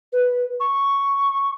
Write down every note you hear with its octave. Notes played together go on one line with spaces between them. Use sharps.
B4
C#6